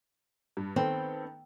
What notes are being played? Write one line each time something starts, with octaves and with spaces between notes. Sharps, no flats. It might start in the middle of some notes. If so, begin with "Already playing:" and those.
G2
D#3 B3 C4 A4